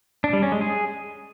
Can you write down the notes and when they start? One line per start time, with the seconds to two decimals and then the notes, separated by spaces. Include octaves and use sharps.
0.24 D4
0.33 G3
0.43 C#4
0.52 G#3
0.61 G#4